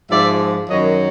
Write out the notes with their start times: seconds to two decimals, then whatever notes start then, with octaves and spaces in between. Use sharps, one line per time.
0.11 G#2 F3 D5 E5
0.69 F#2 D#3 F#3 C#5 D#5